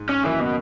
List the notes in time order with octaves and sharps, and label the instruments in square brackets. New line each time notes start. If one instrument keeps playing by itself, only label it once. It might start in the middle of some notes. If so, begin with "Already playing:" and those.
Already playing: [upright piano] G#2 D#4
[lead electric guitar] C#4
[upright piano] F#1 F#2 D#3 [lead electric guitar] E3
[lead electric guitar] B2